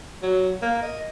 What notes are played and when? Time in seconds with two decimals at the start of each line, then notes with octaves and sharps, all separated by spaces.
0.23 F#3
0.62 A#3
0.82 D#5